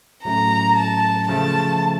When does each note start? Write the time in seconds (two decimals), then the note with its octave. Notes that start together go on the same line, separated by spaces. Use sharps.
0.24 A2 F#3 A3 C#4 A#5
0.76 A5
1.28 C#3 F3 A3 A5